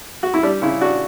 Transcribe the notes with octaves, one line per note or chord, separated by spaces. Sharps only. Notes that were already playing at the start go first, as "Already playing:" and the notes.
F#4
E4
G3 D4
C#3 E4
D4 F#4